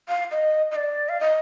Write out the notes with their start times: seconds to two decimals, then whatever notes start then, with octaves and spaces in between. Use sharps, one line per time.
0.09 F5
0.31 D#5
0.71 D#5
0.76 D5
1.09 F5
1.20 D#5